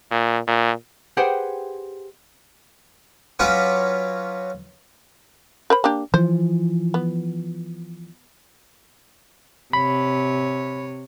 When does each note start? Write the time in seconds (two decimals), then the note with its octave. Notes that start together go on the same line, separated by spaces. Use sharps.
0.11 A#2
0.48 A#2
1.17 G4 G#4 B4 C5 F#5 G5
3.39 F#3 C#4 F4 B4 F#5 D6
5.70 A#4 C5 B5
5.84 A#3 D4 G4
6.14 E3 F3 C5
6.94 B3
9.73 C3 C#5 B5